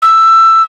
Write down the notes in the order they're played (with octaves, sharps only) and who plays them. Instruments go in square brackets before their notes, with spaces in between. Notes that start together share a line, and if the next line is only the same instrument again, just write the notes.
[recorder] E6